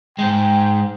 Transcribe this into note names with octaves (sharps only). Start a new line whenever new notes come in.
G#2 G#3 G5